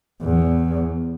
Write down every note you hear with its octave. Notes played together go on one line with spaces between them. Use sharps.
E2